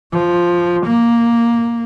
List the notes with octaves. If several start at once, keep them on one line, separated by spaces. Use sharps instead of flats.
F3
A#3